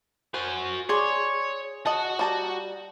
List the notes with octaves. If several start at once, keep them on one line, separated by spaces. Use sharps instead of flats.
F#4 C5 G#5
G#4 C#5 D5 C6
F#4 D#5 F#5 A5
G3 A5 A#5